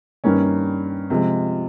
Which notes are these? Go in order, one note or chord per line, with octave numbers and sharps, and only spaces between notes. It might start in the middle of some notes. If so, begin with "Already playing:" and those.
G2 D#3 G3 A#3 C#4
C3 F3 G#3